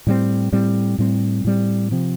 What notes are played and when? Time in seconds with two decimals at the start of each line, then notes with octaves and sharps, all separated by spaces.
0.07 A2 G3 C4
0.53 A2 G3 C4
0.98 A2 G3 C4
1.45 A2 G3 C4
1.91 C3 F3 C4